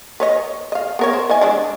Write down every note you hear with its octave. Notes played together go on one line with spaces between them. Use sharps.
B4 C#5 D#5
D#5 F5
B3 A#4 C#5
A#4 C5
E3 D#5 G#5
G#3 D4 D5